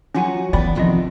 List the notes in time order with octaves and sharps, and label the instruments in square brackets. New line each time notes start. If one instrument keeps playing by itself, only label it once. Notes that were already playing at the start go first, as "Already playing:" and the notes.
[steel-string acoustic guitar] F#3 F#4 C#5 [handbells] C#4 F4 G#5
[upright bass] E3 [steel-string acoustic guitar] B3 [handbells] D5 G5 B5
[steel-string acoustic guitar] C3 D#3 F3 [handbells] B3 F4 D#5